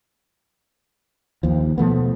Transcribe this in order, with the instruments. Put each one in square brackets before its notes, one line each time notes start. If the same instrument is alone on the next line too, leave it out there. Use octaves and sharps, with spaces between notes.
[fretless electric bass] D#2 F3
B2 F3 A3 B3